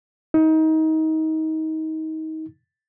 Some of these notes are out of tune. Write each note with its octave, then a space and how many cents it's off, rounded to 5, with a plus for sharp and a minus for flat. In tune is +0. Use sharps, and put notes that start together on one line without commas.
D#4 +25